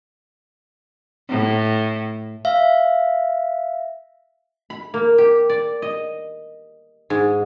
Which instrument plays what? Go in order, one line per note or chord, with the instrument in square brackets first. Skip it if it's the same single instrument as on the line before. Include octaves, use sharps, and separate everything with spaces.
[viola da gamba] A2
[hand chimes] E5 F5
[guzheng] B5
A#3
G4
D5
D#5
G#2